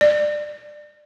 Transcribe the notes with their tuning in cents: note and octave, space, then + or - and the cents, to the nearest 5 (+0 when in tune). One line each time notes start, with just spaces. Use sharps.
D5 +20